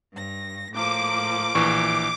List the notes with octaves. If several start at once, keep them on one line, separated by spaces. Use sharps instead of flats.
G2 A#6
A2 F3 A#3 D6
A#1 E3 C#6